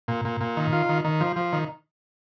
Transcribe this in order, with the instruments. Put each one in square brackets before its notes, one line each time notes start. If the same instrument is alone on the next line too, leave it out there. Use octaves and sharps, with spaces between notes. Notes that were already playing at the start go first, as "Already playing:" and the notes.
[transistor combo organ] A#2
A#2
A#2
D#3
F4
D#3
D#3
F3
F3
D#3